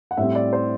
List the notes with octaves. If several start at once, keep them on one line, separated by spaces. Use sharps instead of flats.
F#5
A2 G3 C4 E5
D5
C5